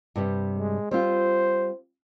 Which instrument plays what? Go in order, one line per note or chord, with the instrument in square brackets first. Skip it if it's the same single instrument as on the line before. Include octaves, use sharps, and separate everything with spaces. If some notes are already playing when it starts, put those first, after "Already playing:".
[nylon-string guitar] G2 C3 G3
[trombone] G#3
[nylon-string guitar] G3 C4 F4 [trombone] C5